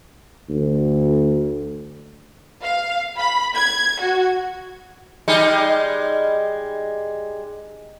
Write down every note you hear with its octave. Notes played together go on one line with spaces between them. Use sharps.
D2
F5
B5
G#6
F#4
G3 G#3 D#4